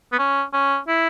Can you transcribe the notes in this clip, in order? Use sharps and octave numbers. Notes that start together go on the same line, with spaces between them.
B3
C#4
C#4
E4